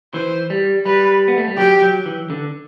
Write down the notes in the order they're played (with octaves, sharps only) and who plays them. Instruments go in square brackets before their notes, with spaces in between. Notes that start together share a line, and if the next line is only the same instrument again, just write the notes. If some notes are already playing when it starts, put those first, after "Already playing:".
[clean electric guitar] E3 [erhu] C5
[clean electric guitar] G3
[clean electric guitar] G3 [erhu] B4
[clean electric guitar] B3
A3
G3
[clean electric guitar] F#3 [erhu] G4
[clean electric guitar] F#3
E3
D3